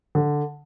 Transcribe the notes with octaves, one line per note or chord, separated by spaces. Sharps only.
D3